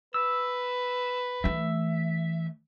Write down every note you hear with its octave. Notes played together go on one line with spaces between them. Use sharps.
B4 E6
E3 A3 E5